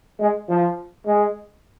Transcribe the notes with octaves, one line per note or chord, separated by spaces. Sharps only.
G#3
F3
G#3